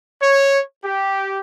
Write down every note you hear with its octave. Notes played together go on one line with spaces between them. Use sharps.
C#5
G4